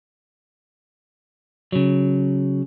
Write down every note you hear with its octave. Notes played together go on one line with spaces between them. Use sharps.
C#3 F#3